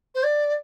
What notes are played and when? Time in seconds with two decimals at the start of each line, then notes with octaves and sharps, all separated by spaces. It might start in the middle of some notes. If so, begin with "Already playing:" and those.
0.15 C5
0.23 D5